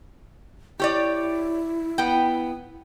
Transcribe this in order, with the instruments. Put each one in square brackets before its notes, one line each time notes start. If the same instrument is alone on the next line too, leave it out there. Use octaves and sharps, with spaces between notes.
[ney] E4 [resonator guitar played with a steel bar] G4 C#5 D5
[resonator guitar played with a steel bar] B3 G5